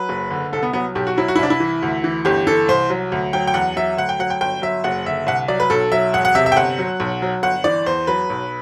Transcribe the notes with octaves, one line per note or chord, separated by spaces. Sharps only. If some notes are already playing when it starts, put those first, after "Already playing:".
Already playing: F#3 B4
F#1
D3
C2 A4
B3
F#3 B3
B1 G4
F#4
F#3 E4
F#4
E4
C2 D4
E4
E3
D2
E3
G1 G4
E3 A4
C2 C5
F#3
D2
F#3 G5
G5
E2 F#5
F#3 E5
D2 F#5
G5
F#3 F#5
G5
G1 G5
F#3 E5
F#1 F#5
D3 E5
C2 F#5
F#3 D5
B4
B1 A4
F#3 E5
E1 F#5
F#5
C3 E5
E5
G5
G1 F#5
F#3
B1
F#3
G1 F#5
E3 D5
E2 C5
F#3 B4
B1